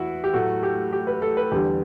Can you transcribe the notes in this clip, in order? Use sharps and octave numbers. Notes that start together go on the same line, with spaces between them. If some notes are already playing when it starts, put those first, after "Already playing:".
Already playing: E2 E4 F#4
G4
A2 F#3 A3 F#4
G4
G4
B4
A4
B4
E2 D3 G3 G4